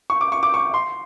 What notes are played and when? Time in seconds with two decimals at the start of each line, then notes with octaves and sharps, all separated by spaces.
0.10 C#6
0.21 D6
0.32 C#6
0.43 D6
0.54 C#6
0.74 C6